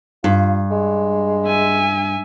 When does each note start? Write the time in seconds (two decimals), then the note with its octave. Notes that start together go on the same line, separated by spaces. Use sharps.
0.24 G2 F4
0.71 G#3
1.47 E5 G#5